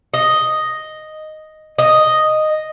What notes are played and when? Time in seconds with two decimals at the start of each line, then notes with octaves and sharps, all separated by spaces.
0.14 D#5
1.78 D#5